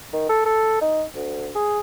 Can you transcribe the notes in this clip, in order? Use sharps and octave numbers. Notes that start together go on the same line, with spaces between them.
D#3
A4
A4
D#4
D2
G#4